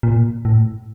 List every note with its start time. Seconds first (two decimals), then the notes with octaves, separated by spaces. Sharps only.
0.03 A#2
0.45 A2